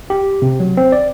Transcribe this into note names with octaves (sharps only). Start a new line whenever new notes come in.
G4
C3
F#3
C4
D5